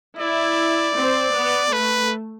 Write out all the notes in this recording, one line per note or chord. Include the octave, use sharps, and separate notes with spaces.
E4 D5
C4
B3
A3 B4